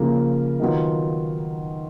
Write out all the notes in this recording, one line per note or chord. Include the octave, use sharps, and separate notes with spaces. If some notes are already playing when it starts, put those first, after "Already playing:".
Already playing: C#3 F3 A#3
D#3 F#3 B3 F4